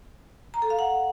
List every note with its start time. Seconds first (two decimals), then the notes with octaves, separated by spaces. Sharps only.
0.54 A#5
0.62 A4
0.70 F5
0.79 F#5